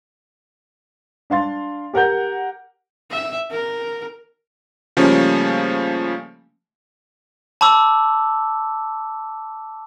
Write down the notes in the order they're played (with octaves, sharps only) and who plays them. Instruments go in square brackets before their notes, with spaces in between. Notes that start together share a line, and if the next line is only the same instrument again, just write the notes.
[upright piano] D4 F5 C6 A6
G4 A#4 F#5 G6
[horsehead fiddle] E5
A#4
[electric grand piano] C#3 F3 G3 A3 A#3 C#4
[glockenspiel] A5 B5 D6 E6